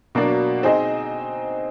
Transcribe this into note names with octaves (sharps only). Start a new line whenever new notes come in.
B2 F#3 A#3 D4
C4 D#4 G#4 C5 D#5